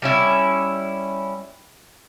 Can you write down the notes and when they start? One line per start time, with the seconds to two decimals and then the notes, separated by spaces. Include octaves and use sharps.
0.02 G3 C#4 E4